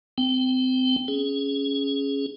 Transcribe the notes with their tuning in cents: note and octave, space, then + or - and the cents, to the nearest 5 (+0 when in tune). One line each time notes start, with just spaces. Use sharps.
C4 -30 G5 +0
C#4 +0 G#4 +10